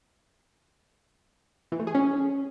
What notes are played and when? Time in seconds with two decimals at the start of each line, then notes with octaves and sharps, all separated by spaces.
1.72 E3
1.79 A3
1.87 G#4
1.95 C#4